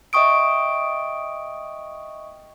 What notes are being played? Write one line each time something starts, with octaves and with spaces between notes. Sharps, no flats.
D#5 E5 G5 C#6 D#6 D7